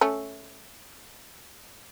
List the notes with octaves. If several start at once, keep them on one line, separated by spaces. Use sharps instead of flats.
A3 C#4